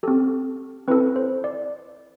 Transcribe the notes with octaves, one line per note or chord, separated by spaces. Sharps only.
C4 G4 A4
C4 E4 A4 B4
C5
D5